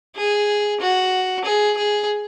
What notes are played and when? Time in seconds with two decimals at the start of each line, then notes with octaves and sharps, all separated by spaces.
0.16 G#4
0.80 F#4
1.44 G#4
1.77 G#4